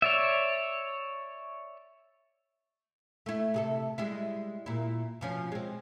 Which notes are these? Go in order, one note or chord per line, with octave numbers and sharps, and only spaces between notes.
C#5 D5 E5
A3 E4
C3 G#4 A4
G3 G#3 E4
A#2 E4
B2 F3 C#4
G#3 C4